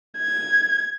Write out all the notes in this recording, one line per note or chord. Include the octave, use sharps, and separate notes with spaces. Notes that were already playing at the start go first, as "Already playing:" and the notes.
G#6